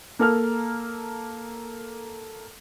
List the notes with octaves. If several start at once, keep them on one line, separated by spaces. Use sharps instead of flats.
A#3 A4 F6